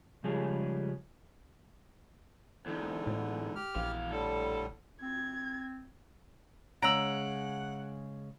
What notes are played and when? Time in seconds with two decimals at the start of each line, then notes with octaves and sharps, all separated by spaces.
0.24 C#3 F3 G3 G#3 C#4 G#4
2.66 E2 G#2 D3
3.07 A2
3.56 G4 F6
3.76 A#1 E2 F5
4.11 A2 D3 G3 A4
5.02 C4 G#6
6.82 C#3 G#3 F#5 A#5 E6 D7 F#7